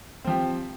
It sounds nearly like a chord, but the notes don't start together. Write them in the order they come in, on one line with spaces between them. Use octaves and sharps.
C4 F3 G4